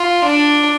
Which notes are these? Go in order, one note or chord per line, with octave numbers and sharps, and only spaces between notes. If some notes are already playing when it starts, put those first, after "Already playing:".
Already playing: F4
D4